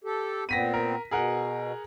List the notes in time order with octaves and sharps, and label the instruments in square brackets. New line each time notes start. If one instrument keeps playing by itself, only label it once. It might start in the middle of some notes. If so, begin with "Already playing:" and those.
[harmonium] G4 A4
[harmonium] A#2 B3 C4 [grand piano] A#6 B6 D#7
[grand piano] A#4
[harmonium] B2 [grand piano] G#4 A#4 F#5